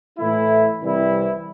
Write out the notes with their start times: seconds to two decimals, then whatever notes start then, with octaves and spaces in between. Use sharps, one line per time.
0.19 A2 E3 A3 E4
0.82 C2 C3 E3 G3 E4